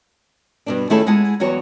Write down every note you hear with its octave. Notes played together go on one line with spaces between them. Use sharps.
G2 B2 D4
D#3 A3 C#4 E4 G#4 A4
G#3 E4 G#4 F#5 A5
E2 F#3 G3 F#4 C#5